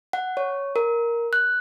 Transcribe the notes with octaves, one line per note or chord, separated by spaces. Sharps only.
F#5
C#5
A#4
F#6